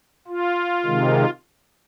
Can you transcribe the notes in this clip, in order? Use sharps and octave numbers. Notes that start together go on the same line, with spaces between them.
F4
C3 D#3 G#3